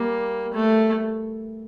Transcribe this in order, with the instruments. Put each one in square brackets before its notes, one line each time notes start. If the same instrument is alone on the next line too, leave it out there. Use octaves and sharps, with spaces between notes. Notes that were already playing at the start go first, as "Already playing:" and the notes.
Already playing: [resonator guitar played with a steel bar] G3 [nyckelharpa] A#3
[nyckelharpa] A3